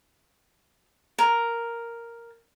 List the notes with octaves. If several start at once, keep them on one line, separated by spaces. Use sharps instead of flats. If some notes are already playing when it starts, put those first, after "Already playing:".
A#4